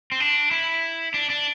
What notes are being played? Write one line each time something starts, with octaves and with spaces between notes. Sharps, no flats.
C4
D4
E4
D4
D4